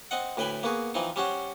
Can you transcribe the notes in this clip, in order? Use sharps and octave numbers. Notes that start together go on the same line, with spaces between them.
C4 D#5 F#5
D2 A2 B4 G5 G#5 B5
A#3 B3 F#4 G#4
E3 F3 C4 D#4
G3 C#4 F#4 C5